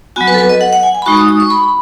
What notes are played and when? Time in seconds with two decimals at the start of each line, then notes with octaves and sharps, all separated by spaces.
0.16 F#3 B3 F#4 G#5
0.28 B4
0.34 A4
0.38 B4
0.49 D#5
0.61 F#5
0.73 F#5
0.83 G#5
0.95 G#5
1.02 B5
1.06 G#3 D#4 F#4 C#6
1.17 D#6
1.28 D#6
1.40 C#6
1.50 B5